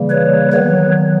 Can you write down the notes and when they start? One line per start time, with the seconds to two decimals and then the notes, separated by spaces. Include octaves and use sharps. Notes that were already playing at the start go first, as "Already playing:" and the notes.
Already playing: C#3 E3 G3 A#3
0.10 B4 C#5
0.52 D#3 F#3 B3 B4 C#5